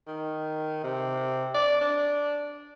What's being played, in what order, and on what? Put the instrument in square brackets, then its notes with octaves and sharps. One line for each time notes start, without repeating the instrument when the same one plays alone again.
[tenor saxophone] D#3
C3
D5
D4